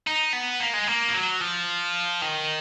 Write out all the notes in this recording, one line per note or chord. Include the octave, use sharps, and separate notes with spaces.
D#4
B3
A#3
G#3
A#3
F3
F#3
F3
D#3